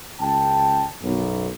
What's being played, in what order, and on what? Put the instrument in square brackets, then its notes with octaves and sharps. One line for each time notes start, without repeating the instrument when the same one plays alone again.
[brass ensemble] C#2 G5 A5
B1 F#2